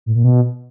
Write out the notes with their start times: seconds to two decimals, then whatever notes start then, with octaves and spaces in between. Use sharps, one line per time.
0.06 A2
0.15 A#2
0.24 B2